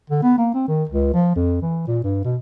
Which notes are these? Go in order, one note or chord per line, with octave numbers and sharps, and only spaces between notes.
D3
B3
A#3
C4
D#3
C#2
F3
F2
E3
A#2
G2
B2